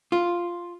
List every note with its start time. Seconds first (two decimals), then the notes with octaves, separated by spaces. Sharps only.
0.12 F4